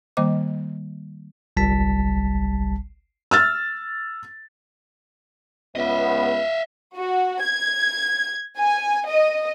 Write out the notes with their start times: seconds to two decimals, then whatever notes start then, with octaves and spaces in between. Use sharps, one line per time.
0.17 D#3 G3 A#3 C5 D#5 D6
1.57 G1 C2 G3 A5 B6
3.31 E6 F6 A6
5.75 C#2 B3 D#5 E5
6.97 F#4
7.44 G#6
8.58 G#5
9.09 D#5